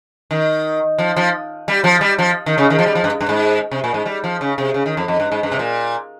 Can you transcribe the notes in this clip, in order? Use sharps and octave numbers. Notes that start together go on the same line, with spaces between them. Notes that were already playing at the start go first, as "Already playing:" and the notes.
D#3
F3
F3
G3
F3
G3
F3
D#3
C#3
D#3
F3
G3
F3
G2
G2
G#2
C3
A#2
G#2
G3
F3
C#3
C3
C#3
D#3
F2
F2
G2
G#2
G2
C3
A#2